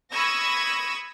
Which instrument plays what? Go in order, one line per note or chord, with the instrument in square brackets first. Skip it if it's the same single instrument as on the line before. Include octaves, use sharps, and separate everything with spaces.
[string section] B5 C#6 D#6 E6 G#6 A#6